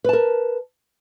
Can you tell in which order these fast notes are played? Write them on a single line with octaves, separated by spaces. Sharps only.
B4 A5 A#4